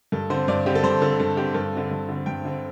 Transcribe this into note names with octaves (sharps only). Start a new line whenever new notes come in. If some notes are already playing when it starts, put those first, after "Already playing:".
G2 A4
D3 C4 C5
G2 D5
D3 C4 G4 A4
G2 C5
D3 C4 A4
G2 A4
D3 C4 G4
G2 A4
D3 C4
G2
D3 C4
G2 G5
D3 C4